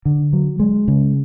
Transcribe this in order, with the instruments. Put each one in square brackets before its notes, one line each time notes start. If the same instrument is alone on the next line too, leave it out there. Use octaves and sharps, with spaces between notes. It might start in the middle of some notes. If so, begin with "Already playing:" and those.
[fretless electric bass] D3
F#3
G#3
C#3